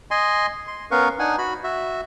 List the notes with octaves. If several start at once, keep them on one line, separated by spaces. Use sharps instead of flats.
D#5 G#5 C6
C6
B3 C#4 A#4 B4 F5 C#6
D4 D#4 F#5 G#5
F#4 B5
F#4 E5